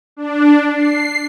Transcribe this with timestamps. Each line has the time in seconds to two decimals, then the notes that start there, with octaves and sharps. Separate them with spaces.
0.17 D4
0.76 C7